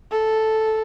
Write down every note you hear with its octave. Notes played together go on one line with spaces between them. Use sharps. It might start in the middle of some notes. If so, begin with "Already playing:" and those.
A4